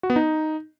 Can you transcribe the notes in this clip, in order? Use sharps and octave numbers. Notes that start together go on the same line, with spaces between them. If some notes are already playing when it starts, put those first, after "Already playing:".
F#4
B3
D#4